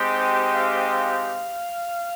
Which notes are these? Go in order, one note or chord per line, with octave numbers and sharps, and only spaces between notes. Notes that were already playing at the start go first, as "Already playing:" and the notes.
Already playing: G#3 C4 D#4 G4
F5
F5